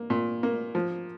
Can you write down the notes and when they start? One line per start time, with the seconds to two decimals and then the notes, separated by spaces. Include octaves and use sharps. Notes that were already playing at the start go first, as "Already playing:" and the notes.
Already playing: A#3
0.10 A#2
0.43 A#3
0.75 F3